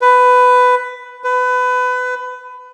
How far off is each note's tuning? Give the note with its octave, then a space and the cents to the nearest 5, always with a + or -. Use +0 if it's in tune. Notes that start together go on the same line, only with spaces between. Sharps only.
B4 +15
B4 +25